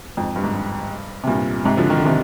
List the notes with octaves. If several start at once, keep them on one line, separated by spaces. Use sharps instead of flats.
F2 G#2
G2
G#2
G2
C3
G2 A#2
G#2 C3
D3 F3
D#3
D3
C3 D#3